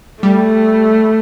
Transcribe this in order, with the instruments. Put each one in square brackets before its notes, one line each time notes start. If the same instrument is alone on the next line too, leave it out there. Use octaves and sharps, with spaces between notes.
[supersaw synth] G3 [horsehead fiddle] A3